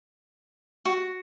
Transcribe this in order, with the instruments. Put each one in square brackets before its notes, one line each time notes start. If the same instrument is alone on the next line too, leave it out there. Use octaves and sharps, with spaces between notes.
[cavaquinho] F#4